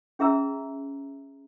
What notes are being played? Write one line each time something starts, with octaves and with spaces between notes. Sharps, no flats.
C#4 G#4 E5 A#5 E6